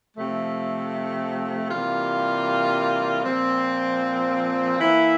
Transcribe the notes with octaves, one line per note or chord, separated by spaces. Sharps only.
C3 F3 A3
C3 E3 G3 A#3 F4
A#2 F3 C4
E3 A#3 E4